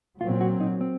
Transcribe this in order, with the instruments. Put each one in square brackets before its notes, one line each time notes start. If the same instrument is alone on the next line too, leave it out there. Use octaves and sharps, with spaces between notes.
[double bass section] A#2 F#3 C4 [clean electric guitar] F4
[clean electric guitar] F#4
D#4
C4